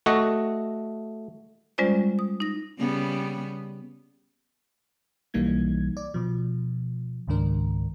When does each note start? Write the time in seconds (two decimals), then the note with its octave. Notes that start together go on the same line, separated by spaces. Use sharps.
0.06 A3 F#4 D#5
1.78 G3 G#3 C#4 F4 C5 D5
2.19 D#6
2.40 D#4 A#6
2.79 C#3 G3 B3
5.34 B1 E3 G3 A#3 D#4 G#6
5.97 D5
6.14 B2 F3
7.28 C#2 G#2 D#3 D4 A#4